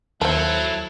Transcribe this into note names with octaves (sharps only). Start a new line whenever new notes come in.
D#2 F#3 E4 A4 C5 F5 A5